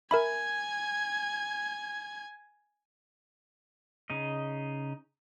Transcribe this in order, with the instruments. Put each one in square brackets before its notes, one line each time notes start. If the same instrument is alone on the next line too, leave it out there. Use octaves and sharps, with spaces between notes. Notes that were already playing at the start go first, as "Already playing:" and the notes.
[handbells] A#4 E5 B5 [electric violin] G#5 G#6
[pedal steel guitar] C#3 D#4 D#5